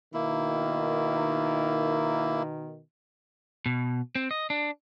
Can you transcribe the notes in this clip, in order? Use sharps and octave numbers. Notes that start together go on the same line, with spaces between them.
B2 D#3 A#3 E4
B2
C4
D#5
D4